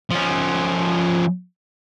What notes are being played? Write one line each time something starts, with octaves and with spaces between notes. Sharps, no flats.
F3 C#4